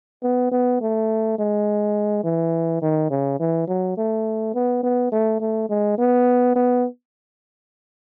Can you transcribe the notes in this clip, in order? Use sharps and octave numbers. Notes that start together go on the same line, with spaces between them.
B3
B3
A3
G#3
E3
D#3
C#3
E3
F#3
A3
B3
B3
A3
A3
G#3
B3
B3